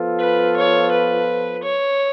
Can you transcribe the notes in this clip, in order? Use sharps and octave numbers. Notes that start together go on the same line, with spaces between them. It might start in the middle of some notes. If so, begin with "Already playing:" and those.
Already playing: F3 B3 F4 A4
B4
C#5
B4
C#5